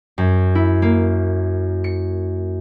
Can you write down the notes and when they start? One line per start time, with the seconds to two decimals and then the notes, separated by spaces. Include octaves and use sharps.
0.18 F#2
0.55 E4
0.82 A#3
1.84 C#7